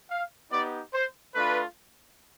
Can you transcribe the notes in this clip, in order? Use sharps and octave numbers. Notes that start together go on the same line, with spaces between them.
F5
B3 D#4 G4 D5
C5
A3 D4 F4 B4